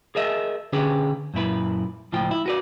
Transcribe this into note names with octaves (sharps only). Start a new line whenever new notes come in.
G#4 A#4 D#5 E5
D3 C#4 D4 G4 G#4 B4
F#2 A#2 E4 B4
C#2 A2 F3 F4 G5
E4
F#4 B4 D5